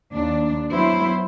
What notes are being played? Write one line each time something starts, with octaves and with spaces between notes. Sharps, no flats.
D#2 D4
F#3 B3 E4 C5